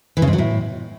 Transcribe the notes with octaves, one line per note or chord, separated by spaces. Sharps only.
E3
C#3
G#2
F#3
A2